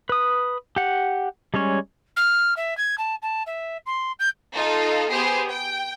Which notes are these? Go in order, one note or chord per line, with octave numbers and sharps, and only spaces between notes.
B4 D#6
G4 F#5
G3 G#3 C#4 C#5
F6
E5
G#6
A5
A5
E5
C6
G6
D#4 F4 A4
B3 G4 G#4 C5
G5